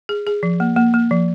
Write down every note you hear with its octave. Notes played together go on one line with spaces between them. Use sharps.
G#4
G#4
F3
A#3
A#3
A#3
F3